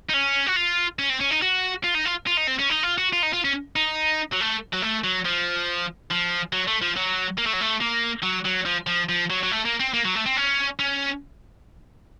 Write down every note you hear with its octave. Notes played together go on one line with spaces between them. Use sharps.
D#4
C#4
F#4
F4
C#4
C4
C#4
D#4
F#4
F4
D#4
F4
F4
D#4
C4
C#4
D#4
F4
F#4
F4
D#4
F4
C#4
D#4
F#3
A3
F#3
A3
F#3
F3
F3
F#3
A3
F3
F#3
A#3
A3
F#3
A3
A#3
F#3
F#3
F3
F3
F3
F#3
F#3
A3
A#3
C4
A#3
F#3
A3
C4
C#4
C#4